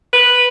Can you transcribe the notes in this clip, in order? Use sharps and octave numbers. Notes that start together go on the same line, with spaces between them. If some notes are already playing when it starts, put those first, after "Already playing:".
B4